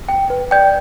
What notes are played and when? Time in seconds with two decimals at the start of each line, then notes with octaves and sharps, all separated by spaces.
0.09 G5
0.30 B4
0.51 D5 G5 G6